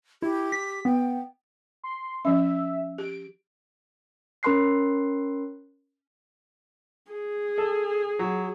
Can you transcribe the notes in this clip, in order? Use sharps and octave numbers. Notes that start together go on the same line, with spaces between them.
E4 G4
B6
B3 G5
C6
F3 C#4 E5
G4 D7
C#4 A#4 B5 C6 F#6 C7
G#4
A4
F#3